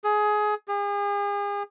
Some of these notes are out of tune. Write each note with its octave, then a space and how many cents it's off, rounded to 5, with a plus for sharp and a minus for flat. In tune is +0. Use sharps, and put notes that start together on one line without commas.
G#4 +20
G#4 -40